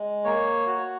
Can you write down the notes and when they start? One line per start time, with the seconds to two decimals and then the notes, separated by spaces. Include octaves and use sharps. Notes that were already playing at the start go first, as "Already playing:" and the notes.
Already playing: G#3
0.24 A#3 C#5
0.67 F#4